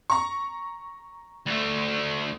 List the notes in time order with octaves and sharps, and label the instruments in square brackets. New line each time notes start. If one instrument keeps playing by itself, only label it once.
[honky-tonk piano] A#5 C#6
[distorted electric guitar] D2 A3